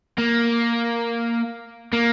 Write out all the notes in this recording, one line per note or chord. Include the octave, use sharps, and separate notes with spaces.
A#3
A#3